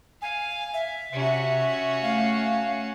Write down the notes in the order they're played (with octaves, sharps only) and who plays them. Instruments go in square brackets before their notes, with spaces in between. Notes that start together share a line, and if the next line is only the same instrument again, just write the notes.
[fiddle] F5 [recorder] G#5
[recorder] E5
[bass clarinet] C3 [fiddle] C#4 F#4
[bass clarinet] A3 [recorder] F5